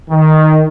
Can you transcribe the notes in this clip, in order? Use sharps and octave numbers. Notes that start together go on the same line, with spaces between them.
D#3